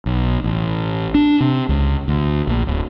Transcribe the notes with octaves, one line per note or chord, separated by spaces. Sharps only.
B1
A1
D4
C3
C#2
D2
A#1
D1